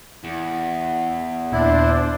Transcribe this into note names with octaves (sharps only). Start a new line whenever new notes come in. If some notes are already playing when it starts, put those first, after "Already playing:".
E2
D#2 A#2 D4 E4 C5